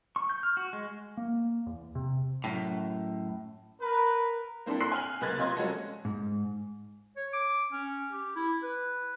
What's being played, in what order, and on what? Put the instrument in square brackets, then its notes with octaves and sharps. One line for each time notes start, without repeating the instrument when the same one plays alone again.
[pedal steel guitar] C#6
G6
F6
F#4
G#3
[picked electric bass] A#3
E2
C3
[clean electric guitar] F#2 A2
[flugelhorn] A#4 [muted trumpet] B4
[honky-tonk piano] A#3 C4 D4 E4 A4
C6 F#6 C7
G#5 F6 F#7
C#2 A#3 B4 F#6 G#6 A6
C3 F4 D#5 C6 G#6
G3 G#3 A#3 C#4 F#4 A4
[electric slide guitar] G#2
[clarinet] C#5
D6
C#4
G4
E4
B4